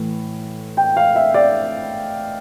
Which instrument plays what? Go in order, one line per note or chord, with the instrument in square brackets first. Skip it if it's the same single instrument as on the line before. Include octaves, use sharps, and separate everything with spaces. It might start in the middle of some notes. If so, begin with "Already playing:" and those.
Already playing: [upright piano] A2 E3
G5
F5
E5
D5